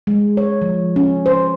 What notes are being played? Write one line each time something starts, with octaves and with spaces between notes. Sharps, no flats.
G#3
C#5
F3
C#4
C5